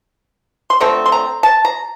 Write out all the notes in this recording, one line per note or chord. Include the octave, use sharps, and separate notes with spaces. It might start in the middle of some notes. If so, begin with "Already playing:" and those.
C6
D3 F3 A3 C4 A#5
C6
A#5
A5
A#5